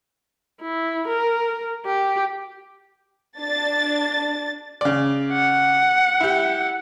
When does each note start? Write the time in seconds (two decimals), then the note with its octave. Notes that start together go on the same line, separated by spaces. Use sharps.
0.61 E4
1.07 A#4
1.85 G4
3.38 D4 A6
4.81 C#3 D5
5.33 F#5
6.20 E4 G4